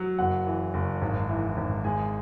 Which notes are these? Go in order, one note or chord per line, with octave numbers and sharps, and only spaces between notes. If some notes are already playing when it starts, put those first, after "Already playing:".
Already playing: F#3
F#1 F#5
E3
F#1
G#1
E3
G#1
G#3 G#5